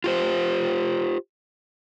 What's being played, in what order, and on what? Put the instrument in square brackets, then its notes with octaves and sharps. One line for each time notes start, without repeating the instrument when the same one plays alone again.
[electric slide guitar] F4 G4 C5